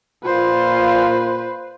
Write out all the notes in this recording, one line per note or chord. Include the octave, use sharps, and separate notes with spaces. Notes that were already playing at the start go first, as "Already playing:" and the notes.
A#2 F4 B4 C5